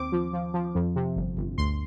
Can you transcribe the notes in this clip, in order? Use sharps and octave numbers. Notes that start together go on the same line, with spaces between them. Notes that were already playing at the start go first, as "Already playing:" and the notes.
Already playing: D#2 C4 D6
F3
F3
F3
F2
C3
G1
G1
D2 C6